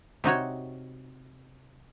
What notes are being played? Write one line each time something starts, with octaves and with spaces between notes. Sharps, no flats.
C3 D#4 F#4 C#5